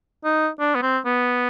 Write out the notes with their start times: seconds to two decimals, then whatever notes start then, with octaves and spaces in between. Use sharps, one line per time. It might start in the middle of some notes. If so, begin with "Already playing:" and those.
0.25 D#4
0.60 D4
0.75 B3
0.82 C4
1.05 B3